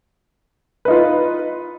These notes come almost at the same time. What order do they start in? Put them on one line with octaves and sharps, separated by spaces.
B4 D#4 F4